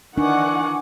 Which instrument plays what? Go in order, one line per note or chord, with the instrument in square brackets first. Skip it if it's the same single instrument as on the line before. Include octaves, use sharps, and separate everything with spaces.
[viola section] D#3 E3 F#5 [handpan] D4 [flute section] G#5 C#6 D6